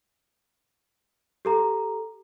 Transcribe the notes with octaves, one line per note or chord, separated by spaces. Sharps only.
G4 A4 A#5